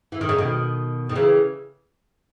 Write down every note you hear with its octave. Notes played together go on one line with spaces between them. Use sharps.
E3
D#3
C#3
B2 D#3
D#3
C#3 E3